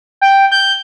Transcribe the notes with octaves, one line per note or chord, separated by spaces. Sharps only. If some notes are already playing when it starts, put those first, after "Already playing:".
G5
G6